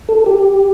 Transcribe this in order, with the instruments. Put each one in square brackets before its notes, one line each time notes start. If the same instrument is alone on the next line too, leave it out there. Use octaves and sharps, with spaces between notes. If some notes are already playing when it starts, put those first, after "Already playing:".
[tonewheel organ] A4
G4